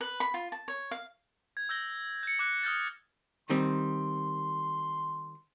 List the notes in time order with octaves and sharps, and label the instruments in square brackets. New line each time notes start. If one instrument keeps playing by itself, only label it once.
[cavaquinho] B4
B5
F4
A5
C#5
F5
[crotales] G#6
E6 G6 A#6 G7
G6 C#7
D6 F#6 C#7
D#6 F6 G6 A6
[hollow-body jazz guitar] D#3 G3 C4 [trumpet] C6